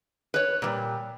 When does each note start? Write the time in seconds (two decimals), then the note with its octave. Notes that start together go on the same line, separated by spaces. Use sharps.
0.34 B4 C#5
0.62 A#2 G3